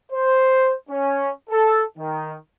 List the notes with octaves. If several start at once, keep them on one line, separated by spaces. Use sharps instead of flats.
C5
C#4
A4
D#3